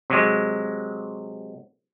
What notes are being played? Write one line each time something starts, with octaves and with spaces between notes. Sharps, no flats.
C3 F#3 G#3